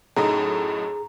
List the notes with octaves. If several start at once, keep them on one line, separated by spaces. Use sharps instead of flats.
F#2 A2 D#4 G#4 A#5